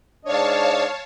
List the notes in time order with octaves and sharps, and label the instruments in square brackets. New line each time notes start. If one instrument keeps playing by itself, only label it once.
[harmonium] G#2 D4 D#5 [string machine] C#5 F5 A5